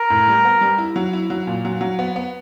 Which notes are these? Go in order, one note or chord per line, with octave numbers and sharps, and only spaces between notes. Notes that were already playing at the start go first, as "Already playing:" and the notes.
Already playing: A#4
A2
G3
B3
G3
E4
F#3
E4
F#3
A#2
F#3
F#3
B3
B3